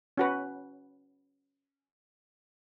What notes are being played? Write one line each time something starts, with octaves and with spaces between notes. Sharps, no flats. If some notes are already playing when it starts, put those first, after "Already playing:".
C#4 F#4 B4